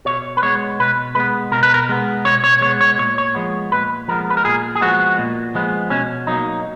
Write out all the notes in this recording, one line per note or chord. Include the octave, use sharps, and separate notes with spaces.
B2 C#5
B4
G#3 B3 C#5
B2 B4
G#3 B3 B4
B2 A#4
B4
A#4
G#3 B3
B2 C#5
C#5
G#3 B3 C#5
C#5
A#2 C#5
C#5
F3 G#3 B3
A#2 B4
F3 G#3 B3 A#4
B4
A#4
A#2 G#4
G#4
F3 G#3 B3 F#4
A#2
F3 G#3 B3
B2 C#4
F#3 A#3 D#4